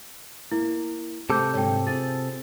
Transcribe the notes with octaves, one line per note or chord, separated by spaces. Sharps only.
A#3 E4
C3 A3 G4 A4 C5 D6 G6
G#2 D3 F#3 C#5 G5
C4 F4 G#4 A6